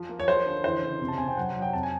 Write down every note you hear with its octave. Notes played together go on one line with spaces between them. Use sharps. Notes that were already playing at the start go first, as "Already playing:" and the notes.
Already playing: F3
A#3
C#5
F3 C5
D3
E3 C5
C#3
C3
A5
C3 G#5
G5
F#3 F#5
F#5
F#3
G5
F2 A5
G#5